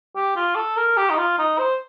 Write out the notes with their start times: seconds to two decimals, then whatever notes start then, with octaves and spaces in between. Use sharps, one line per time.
0.16 G4
0.36 F4
0.55 A4
0.77 A#4
0.97 G4
1.10 D#4
1.18 F4
1.38 D#4
1.58 C5